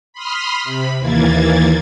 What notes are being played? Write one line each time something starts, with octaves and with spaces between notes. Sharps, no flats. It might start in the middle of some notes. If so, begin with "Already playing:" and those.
B5 C6 D#6 F6
C3 B5
D#2 E3 A#3 G#6 A6